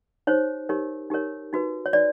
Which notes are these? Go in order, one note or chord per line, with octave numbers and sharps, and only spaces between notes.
D#4 G4 C5 C#5
D#4 G4 A#4 C#5
D#4 G4 A#4 C#5
D#4 F#4 B4
C#5
D#4 F#4 B4 D5